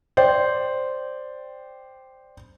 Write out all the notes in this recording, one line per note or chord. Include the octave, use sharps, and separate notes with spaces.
C5 D5 G5